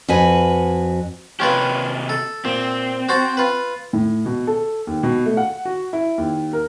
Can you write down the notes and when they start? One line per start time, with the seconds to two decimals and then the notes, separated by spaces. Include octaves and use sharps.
0.08 F2 F#4 B4 G#5
1.40 C3 A#3 C#4 F4 G4 B4
2.09 A4
2.45 A#2 C4
3.09 F#4 C5 A5
3.37 F4 B4
3.93 A2
4.26 B2
4.47 A4
4.87 D#2
5.03 B2
5.26 A3
5.37 F#5
5.65 F#4
5.93 E4
6.18 D#2
6.53 A#4